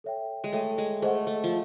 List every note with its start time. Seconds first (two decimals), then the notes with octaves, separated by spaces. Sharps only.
0.04 A4 C#5 E5 G5
0.44 G#3
0.53 A3 A4 C#5 E5 G5
0.78 G#3
1.02 A3 G#4 C5 D#5 F#5
1.27 A3
1.44 F3